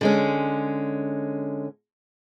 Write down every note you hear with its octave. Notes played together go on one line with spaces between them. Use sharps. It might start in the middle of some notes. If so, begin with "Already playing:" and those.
D3 G#3 C#4